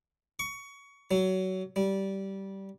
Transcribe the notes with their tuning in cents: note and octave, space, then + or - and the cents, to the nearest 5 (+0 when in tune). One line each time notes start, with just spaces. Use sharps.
C#6 +20
F#3 +20
G3 -15